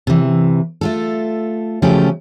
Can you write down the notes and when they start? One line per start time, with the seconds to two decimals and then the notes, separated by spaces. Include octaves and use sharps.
0.07 C3 E3
0.81 A3 F4 A4
1.82 C#3 F3 F#3 A3 C#4 G4